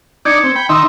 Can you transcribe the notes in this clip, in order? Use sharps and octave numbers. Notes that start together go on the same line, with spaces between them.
D4 D#4 D5 G6 G#6 C#7
C4
G5 B5
D#3 D#4 E5 C6 E6